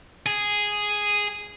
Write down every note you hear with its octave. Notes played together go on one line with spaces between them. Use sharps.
G#4